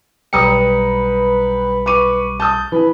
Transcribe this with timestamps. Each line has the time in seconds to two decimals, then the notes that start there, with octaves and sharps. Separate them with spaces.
0.33 B1 G3 B4 G5 A#5 D#6 C#7
1.86 B4 C#6 D6 D#7
2.40 A5 D#6 G6
2.72 E3 B4